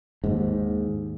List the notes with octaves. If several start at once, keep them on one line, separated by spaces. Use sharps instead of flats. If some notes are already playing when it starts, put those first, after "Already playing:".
D#2 G#2